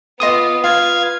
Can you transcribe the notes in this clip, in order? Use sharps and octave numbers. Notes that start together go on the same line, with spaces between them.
B3 F4 D#5 C6 D6 D#6
F4 B4 F5 G#6